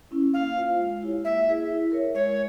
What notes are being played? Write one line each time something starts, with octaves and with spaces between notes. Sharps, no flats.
C#4 E4
A#3 F5
F4 C5
G#3
E4 G4 C#5
A#3 E5
E4 G#4
E4
A#4 C#5 E5
G#3 C#5